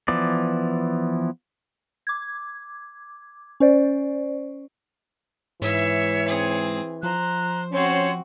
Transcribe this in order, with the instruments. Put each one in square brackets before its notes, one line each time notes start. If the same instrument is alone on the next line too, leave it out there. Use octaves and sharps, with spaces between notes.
[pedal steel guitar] E3 F3 B3 D5
[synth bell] D6 G#6
C#4 C5 D5
[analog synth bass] G#2 [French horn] E3 [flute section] C#5 [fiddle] E5
[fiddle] C4 G#4
[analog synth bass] F3 [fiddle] C5 [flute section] A#5 F#6
[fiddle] C4 F#4 [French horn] C#4 [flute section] C5 C#5 C6